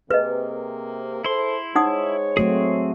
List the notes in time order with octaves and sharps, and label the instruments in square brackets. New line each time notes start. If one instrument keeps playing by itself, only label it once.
[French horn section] C3 A#3 [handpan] G#4 [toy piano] B4 D#5
[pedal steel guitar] E4 C6 [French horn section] A4 C5
[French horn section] G#3 C5 C#5 [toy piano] D#4 F#5 D#6
[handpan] F#3 A3 F#4 [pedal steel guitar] C4 G#4